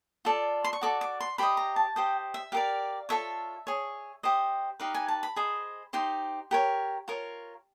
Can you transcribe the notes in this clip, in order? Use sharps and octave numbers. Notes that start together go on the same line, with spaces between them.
F4 A4 D5
C6
C#6
F#4 A4 D5 D6
D6
C6
G4 C5 D#5 B5
A#5
A5
G4 C5 D#5 G5
E5
G4 A#4 D5 F5
F4 A4 C#5 E5
G#4 C#5
G4 C5 D#5
D#4 G4 B4 F5
G#5
A5
B5
G#4 C5 D#5
D#4 G4 C5 C6
G4 A#4 C#5
F4 A#4 C#5